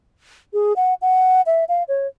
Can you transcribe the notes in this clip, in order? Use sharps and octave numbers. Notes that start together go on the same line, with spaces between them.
G#4
F#5
F#5
E5
F5
C#5